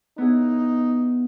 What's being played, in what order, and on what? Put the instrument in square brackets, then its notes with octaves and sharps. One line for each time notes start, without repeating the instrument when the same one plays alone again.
[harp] B3 E4 G#4 [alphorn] D#4